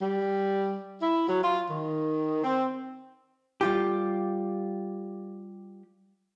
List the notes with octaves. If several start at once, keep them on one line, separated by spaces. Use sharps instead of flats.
G3
E4
F#3
F4
D#3
C4
G3 F4 G4